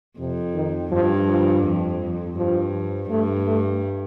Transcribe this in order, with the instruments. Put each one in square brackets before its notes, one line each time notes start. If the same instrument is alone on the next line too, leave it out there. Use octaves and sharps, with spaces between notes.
[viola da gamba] F2 [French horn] C3
[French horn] D#3
[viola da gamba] G2 [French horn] F3
[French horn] F3
[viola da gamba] F2
[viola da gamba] G2 [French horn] F3
[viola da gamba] G2 [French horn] A3
[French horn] A3